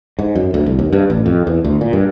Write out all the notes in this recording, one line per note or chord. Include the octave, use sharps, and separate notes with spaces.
G#2
F#2
D2
C2
D#2
G2
A1
F2
E2
D2
A#2
G2